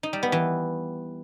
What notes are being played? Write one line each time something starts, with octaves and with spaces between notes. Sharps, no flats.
D#4
G3
B3
E3